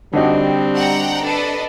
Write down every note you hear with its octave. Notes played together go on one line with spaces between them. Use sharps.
D3 G3 C4 D4 D#4 F#4
F#5 G5 A#5
D4 A4 B4 D#5